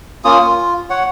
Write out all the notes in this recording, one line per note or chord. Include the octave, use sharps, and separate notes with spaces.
A#3 C#4 F4 D#6
F4
C#5 F#5